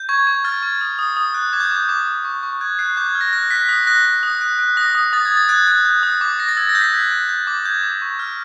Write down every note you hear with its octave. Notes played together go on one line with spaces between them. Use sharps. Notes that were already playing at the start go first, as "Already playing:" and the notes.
Already playing: G6
C#6 G#6
C#6
F6 A6
C#6 G#6
D#6
D#6
D#6
F#6
D6 G#6
G6
D6 G6
D6
D6
C#6
C#6
F#6 G#6
F#6 C7
D6 G6
G#6
F6
A#6
F#6 A#6
F#6 B6
D#6 A#6
F#6 A#6
F#6 A#6
D#6
F#6
F#6
D#6 A#6
D#6
D#6 A6
G#6
D#6
A6
F#6 G#6
F#6
G6
D#6
D6
D6 A#6
A6
E6 G#6
A#6
G6
B6
F#6 G#6
F#6
G6
D6
G6 G#6
D6
C#6
F6